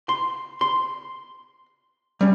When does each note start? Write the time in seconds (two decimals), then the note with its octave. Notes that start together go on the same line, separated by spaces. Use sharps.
0.09 C6
0.61 C6
2.21 G3 C#4